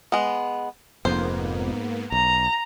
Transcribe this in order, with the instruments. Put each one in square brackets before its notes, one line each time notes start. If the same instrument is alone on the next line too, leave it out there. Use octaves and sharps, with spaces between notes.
[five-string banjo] G#3 B3
[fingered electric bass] F1 F2 [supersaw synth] G#2 A#3 B3 [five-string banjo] C5
[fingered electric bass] B1 [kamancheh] A#5